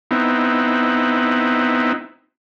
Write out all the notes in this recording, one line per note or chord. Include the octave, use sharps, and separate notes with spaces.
B3 C4 D#4 E4